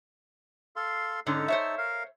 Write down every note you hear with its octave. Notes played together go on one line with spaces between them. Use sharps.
A4 F5 C6
G#2 D3 C#4 D#4 A4
C5 C#5 E5
A#4 F5